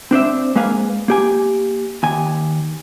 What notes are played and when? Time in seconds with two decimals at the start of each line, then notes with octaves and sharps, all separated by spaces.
0.11 C4 D4 C5 E5
0.56 G#3 A#3 B4 F5 G#5
1.08 A#3 G4 G#5
2.03 D#2 G#5